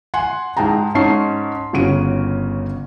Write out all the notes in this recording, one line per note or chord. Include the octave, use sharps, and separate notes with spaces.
F#5 G#5 C6
G#2 G#4 G5 A5 A#5
G#2 C#4 D#4 A5 C#6 C7
G1 C#3 C#4 F#4 D7 D#7